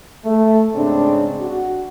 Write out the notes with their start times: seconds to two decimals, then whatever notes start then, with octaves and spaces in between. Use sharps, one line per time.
0.25 A3
0.74 G#2 C#3 C4 D4
1.40 F#4